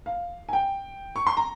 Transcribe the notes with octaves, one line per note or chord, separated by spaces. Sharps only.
F5
G#5
G5
C#6
C6
A#5